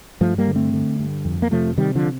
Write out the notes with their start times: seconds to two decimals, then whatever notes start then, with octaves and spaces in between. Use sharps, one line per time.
0.21 G2 F3 A3
0.38 G3 A#3
0.47 D3
0.56 A3 C4
0.74 D3
1.00 G2
1.25 F2
1.42 A#3
1.51 C3 F3 A3
1.78 C3 D#3 G3
1.95 D3 F3